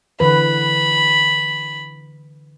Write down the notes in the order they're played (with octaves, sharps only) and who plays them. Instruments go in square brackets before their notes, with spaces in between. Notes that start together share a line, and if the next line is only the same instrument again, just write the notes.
[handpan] D3 E3 B4 [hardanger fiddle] B5